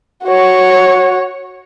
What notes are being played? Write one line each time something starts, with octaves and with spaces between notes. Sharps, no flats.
F#4 C#5